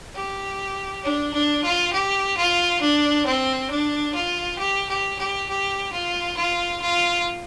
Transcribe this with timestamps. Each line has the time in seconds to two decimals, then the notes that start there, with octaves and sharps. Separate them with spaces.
0.15 G4
1.04 D4
1.33 D4
1.64 F4
1.93 G4
2.37 F4
2.81 D4
3.26 C4
3.70 D4
4.14 F4
4.59 G4
4.89 G4
5.19 G4
5.49 G4
5.92 F4
6.36 F4
6.82 F4